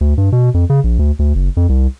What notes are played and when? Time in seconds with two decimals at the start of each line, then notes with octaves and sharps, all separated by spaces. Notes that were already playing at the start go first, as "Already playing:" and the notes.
0.01 D2
0.18 G2
0.32 B2
0.54 F2
0.70 C#3
0.84 A#1
0.99 D2
1.19 D2
1.35 F#1
1.57 F2
1.69 C2